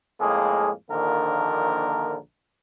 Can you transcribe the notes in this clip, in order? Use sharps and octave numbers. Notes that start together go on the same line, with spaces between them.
F2 A2 G#3 A#3 G#4
A#1 D3 D#3 F3 A#3 A#4